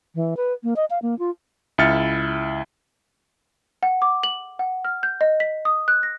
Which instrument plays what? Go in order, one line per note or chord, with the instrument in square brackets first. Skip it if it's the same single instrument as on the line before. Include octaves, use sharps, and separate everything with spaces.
[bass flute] E3
B4
A#3
D#5
F5
A#3
F4
[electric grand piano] C#2 E4 E5 F6 A6 C#7
[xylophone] F#5
D6
F#7
F#5
F6
G6
D#5
B6
D#6
F#6
A#6